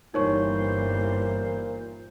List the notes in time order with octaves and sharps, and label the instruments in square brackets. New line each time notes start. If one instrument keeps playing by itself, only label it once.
[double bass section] G1 E3 G3 [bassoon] A#2 [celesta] D#4 C#5 C#6 [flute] C5